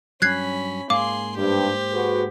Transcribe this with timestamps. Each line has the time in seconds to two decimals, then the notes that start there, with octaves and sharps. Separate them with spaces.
0.22 G2 F#3 C#4 B5 F#6 G#6 C7
0.90 G#2 A#3 G#4 F5 C6 D6
1.37 G2 G4 C5
1.93 F#4 G#4 B4